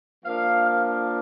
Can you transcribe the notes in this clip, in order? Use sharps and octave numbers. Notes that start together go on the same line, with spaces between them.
F3 A#3 D4 F5
F5